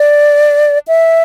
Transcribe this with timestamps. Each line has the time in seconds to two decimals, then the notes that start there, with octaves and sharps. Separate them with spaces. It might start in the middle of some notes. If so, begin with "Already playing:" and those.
Already playing: D5
0.88 E5